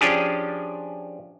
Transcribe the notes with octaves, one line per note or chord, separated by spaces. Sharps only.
F3 C#4 D4 G4 G#4